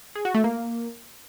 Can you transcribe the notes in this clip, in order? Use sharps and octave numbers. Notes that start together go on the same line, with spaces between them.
G#4
F#4
A3
A#3